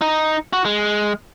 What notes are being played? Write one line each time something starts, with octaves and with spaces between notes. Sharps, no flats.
D#4
F#4
G#3